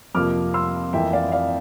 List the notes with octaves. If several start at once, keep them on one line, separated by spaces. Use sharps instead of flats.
F2 C3 F3 A#3 D6 F6
C6 E6
F2 E3 A#3 E5 G5
D5 F5
D5 F5